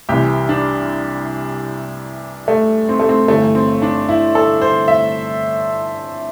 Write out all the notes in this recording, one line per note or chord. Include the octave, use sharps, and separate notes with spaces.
C2 C3 E3 G4
D4
A3
C4
A3
C4
G1 G2 E3 A3
C4
D4
E4
A4
C5
E5